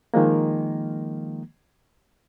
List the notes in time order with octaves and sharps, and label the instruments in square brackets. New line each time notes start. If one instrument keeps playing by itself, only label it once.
[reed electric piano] D#3 F3 G#3 A#3